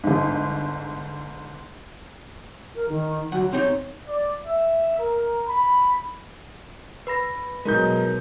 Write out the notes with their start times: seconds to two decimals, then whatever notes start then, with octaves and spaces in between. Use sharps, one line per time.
0.04 G1 G#2
2.76 A#4
2.89 D#3
3.32 D2 F#3 F#5
3.52 C3 C4 D#4 C#5
4.08 D5
4.47 E5
4.99 A#4
5.47 B5
7.07 B4 B5 A#6
7.65 B2 F#3 G#3 D#4 A#4 G6